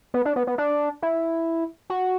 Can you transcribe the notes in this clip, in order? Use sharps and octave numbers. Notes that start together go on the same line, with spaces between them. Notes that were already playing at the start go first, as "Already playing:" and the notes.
B3
D4
B3
B3
D4
E4
F#4